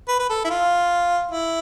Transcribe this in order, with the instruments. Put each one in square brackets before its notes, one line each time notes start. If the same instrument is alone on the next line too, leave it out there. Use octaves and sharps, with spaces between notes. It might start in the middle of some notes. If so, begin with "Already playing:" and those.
[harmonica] B4
B4
A4
E4
F4
E4